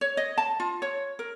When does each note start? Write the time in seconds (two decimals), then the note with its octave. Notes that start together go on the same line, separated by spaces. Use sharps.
0.01 C#5
0.17 D#5
0.38 A5
0.60 F4
0.82 C#5
1.19 A#4